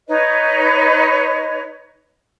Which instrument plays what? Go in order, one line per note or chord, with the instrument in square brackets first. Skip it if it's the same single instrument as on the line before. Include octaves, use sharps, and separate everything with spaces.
[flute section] D#4 B4 C#5 D#5